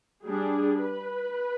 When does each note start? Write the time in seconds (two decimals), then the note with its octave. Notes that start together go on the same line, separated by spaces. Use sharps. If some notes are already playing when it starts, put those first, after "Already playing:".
0.24 G3 D4 G#4
0.80 B4